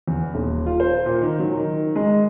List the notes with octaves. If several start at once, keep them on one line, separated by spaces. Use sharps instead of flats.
E2
D#1
F4
C5
A#2
D#3
F#3
D#3
G#3